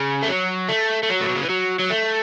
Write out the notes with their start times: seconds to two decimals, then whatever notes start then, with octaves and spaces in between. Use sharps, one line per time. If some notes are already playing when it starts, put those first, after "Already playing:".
Already playing: C#3
0.23 A3
0.28 F#3
0.69 A3
1.03 A3
1.10 F#3
1.21 A2
1.29 B2
1.35 C#3
1.43 E3
1.50 F#3
1.80 F#3
1.91 A3